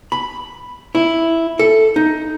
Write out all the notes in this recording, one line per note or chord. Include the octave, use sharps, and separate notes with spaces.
B5
E4
A4
D#4